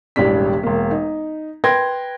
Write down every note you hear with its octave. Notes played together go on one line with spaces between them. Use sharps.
E1 A1 G3 D4 B6
E1 A#3
D#4
B4 G5 C6 G#6 A#6